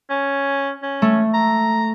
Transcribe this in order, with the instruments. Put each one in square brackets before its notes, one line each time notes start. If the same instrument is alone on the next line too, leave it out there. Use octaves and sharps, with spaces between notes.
[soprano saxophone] C#4
C#4
[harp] A3
[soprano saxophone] A#5